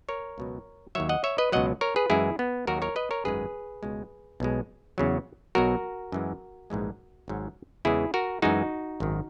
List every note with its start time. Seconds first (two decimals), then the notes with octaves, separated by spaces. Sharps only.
0.09 A#4 C#5
0.38 C#2 B2 F#3
0.95 D#2 D#3 F#3 C#5 E5
1.09 D#5 F#5
1.24 C#5 E5
1.38 B4 D#5
1.52 C#2 B2 F#3 D#5 F#5
1.81 A#4 C#5
1.96 G#4 B4
2.10 F#2 E3 G#3 E4 G#4
2.39 B3
2.67 D#2 D#3 F#3 F#4 A#4
2.82 A#4 C#5
2.96 B4 D#5
3.11 A#4 C#5
3.25 G#1 F#2 D#3 G#3 G#4 B4
3.83 C#2 B2 G#3
4.40 B1 B2 G#3
4.98 E2 C#3 F#3
5.55 B1 B2 F#3 F#4 A#4
6.12 F#2 E3 G#3
6.70 A#1 G#2 E3 G#3
7.28 G#1 G#2 F#3
7.85 E2 C#3 E3 G#3 E4 G#4
8.14 F#4 A#4
8.42 F#2 E3 G#3 D#4 F#4
9.00 G#1 F#2 D#3